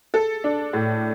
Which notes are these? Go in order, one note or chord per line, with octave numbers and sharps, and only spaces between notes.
A4
D4
A2